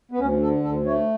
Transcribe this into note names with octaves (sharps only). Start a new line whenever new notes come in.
B3
D2 C#4
D3 A4
D2 A4
A3 C#5